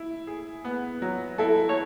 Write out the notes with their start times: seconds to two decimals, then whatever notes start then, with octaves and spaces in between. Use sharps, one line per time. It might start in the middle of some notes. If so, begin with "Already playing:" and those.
Already playing: E4
0.27 G#4
0.65 B3
1.02 F#3
1.38 E4 A4
1.69 C#5